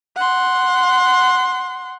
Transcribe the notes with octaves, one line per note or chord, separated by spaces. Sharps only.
F#5 C6